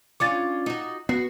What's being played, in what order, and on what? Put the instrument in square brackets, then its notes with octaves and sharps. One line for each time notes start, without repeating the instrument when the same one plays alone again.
[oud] C#4 D4 F4 [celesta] D6 A6
[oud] D#4 F#4
[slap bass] B3 [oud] F#4 [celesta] C7